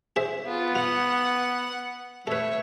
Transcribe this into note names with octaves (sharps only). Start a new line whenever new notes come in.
G#4 C5 E5
B3 F4
F4 F#5
A3 A4 B4 C#5 E5